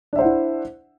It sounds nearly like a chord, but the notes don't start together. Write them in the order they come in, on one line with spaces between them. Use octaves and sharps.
D4 E5 C5 F#5 E4